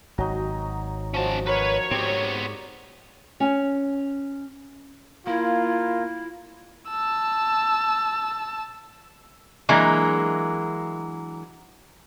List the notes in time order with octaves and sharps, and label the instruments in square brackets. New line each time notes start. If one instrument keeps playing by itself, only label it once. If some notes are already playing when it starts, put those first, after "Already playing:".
[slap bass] G#1 [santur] F#3 D#4
[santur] F3 F#3 D#5 [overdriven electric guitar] C#4 A5
[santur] A#4 [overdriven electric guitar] B4 [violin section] C#5
[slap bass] G#2 [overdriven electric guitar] B3 C4 [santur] G4 D5
[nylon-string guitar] C#4 G#5
[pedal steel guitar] A#3 [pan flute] E4 [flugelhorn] F4
[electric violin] A5 E6
[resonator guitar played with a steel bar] E3 F#3 G#3 A#3 D4